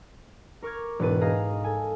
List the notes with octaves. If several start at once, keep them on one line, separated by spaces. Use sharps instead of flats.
A#4 C#6 D6 F6 G#6
E1 G#2 B4 A6 D#7
G#4 D#5 F5 A#5
A4 G#5